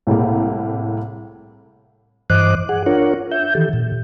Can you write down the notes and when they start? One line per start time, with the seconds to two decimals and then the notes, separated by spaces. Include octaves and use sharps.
0.07 C2 A2 G#3 A#3
2.30 G2 E3 C5 D#5 D6 F#6
2.69 G#4 F#5
2.86 D4 F4 A#4 C#5 F#5
3.31 E5 G6
3.55 D#3 E3 G4 A4
3.73 A#2